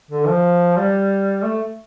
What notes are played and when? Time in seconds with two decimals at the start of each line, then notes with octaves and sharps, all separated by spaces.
0.11 D3
0.27 F3
0.77 G3
1.43 A3